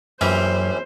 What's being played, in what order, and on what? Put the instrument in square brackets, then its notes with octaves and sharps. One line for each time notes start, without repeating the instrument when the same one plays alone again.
[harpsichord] A#1 E3 G3 [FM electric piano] F#2 F#3 [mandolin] C#4 [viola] C5